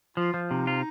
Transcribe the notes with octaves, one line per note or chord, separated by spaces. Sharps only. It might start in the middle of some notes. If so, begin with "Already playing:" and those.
F3 F4
F3
C3 D#4
F4